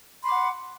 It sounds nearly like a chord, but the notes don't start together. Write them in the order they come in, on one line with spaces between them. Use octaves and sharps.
C6 B5 D6 F#5